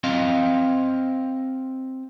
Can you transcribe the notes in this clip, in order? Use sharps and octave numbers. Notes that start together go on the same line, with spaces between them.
C4 D#5 F5